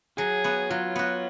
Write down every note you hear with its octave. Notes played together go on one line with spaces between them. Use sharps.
F#3 G#4
B3 F#4
F#3 F4
B3 F#4